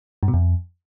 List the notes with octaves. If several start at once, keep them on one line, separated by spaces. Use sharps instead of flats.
G2
B2
F2